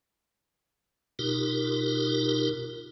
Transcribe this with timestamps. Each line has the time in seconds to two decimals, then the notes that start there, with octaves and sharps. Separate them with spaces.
1.19 B2 D#4 F4 G4 A#4